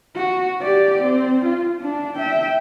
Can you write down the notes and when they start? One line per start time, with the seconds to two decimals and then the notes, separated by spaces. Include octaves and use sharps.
0.16 F#4
0.62 G4 D5
1.03 C4
1.45 F4
1.81 D4
2.15 E5 G5